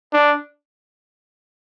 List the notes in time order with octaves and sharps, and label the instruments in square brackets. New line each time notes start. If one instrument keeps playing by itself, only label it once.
[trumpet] D4